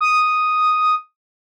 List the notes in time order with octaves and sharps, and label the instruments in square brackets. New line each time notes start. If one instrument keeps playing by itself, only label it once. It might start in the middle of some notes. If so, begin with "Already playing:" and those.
[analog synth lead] D#6